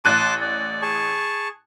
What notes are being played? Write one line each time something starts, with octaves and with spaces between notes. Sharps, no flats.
A1 A5 C6 D6 F#6 D#7
D5
G#4 A5 C#6